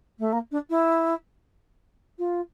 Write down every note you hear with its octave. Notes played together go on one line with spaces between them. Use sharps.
A3
A#3
D4
E4
F4